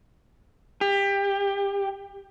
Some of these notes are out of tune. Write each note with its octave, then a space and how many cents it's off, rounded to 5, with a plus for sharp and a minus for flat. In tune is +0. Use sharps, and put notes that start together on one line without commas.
G4 +25